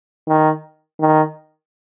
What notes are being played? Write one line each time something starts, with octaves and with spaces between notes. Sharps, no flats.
D#3
D#3